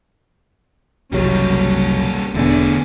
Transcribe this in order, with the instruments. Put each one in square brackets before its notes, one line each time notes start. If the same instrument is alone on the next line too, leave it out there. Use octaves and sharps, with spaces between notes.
[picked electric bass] F#1 C2 F#3 [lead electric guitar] G3 A#3 [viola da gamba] C#4
[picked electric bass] E1 A3 D4 [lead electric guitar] D3 G#4 [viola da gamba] B3